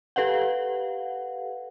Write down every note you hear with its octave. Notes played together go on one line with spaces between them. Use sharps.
G4 A4 B4 F5 F#5